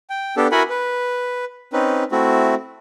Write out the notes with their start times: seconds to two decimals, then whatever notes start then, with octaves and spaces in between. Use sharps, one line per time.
0.10 G5
0.37 B3 D4 G4 A4
0.52 E4 F#4 A#4 F#5 G#5 B5
0.70 B4
1.73 C4 C#4 D#4 B4
2.12 A3 C4 E4 F#4